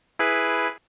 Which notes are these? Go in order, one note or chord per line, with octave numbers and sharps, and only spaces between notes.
E4 G#4 B4